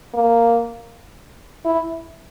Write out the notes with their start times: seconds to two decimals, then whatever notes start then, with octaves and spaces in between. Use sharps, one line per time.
0.14 A#3
1.65 E4